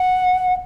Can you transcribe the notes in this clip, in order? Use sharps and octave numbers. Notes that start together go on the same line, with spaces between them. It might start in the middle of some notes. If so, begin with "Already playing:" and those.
Already playing: F#5